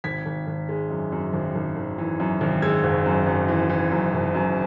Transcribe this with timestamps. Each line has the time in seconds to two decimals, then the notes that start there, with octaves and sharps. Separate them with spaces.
0.04 G#1 G#6 B6
0.26 G#1
0.47 G#1
0.69 G#3
0.90 F#2
1.12 F#2
1.33 G#1
1.55 G#1
1.77 G#1
1.98 E3
2.20 F#2
2.41 G#1
2.62 G#3 E6 G#6
2.83 F#1
3.06 F#2
3.27 F#2
3.48 E3
3.69 E3
3.92 F#2
4.13 F#1
4.35 F#2